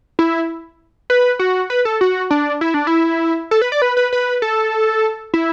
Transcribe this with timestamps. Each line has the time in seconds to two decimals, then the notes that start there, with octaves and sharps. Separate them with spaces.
0.19 E4
1.10 B4
1.39 F#4
1.70 B4
1.85 A4
2.01 F#4
2.30 D4
2.61 E4
2.74 D4
2.87 E4
3.51 A4
3.62 B4
3.72 D5
3.82 B4
3.97 B4
4.13 B4
4.42 A4
5.34 E4